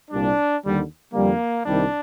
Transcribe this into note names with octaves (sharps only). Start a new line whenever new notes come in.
C2 A#2 G3 D4
D#2 D3 G3
F2 D3 G3 A#3
C2 C3 D#3 G3 D4